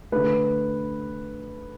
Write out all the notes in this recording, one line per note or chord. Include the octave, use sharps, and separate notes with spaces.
D3 A3 B4